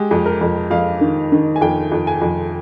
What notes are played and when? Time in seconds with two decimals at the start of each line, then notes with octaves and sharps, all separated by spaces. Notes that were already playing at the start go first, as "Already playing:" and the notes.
Already playing: G#3 G4
0.11 F2
0.26 A#4
0.41 F2
0.71 F2 F5
1.01 D#3
1.32 D#3
1.56 G#5
1.61 F2 G5
1.92 F2
2.07 G#5
2.22 F2